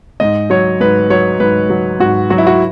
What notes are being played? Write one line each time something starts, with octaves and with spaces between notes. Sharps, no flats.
G#2 D#5
F#3 C#5
G#2 B4
F#3 C#5
G#2 B4
F#3
G#2 F#4
F#3 F#4
E4
F#4